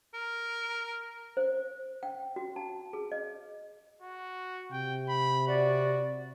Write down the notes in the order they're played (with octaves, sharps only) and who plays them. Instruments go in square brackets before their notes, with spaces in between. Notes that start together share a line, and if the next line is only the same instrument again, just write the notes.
[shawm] A#4
[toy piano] C5
G5
F#4
A5
G#4
D#5
[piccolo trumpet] F#4
[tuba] C3 [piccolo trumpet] G5
[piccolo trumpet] B5
[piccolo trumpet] F#4 [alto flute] D5